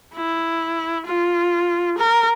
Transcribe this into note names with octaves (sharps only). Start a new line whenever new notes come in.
E4
F4
A#4